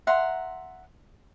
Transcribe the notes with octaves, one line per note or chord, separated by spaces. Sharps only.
E5 F#5 A#5 C6